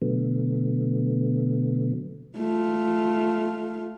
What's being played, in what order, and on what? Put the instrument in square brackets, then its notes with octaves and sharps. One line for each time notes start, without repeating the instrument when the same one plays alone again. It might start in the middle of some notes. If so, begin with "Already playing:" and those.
[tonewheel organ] B2 D3 F#3 A3 B3
[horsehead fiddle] A3 F4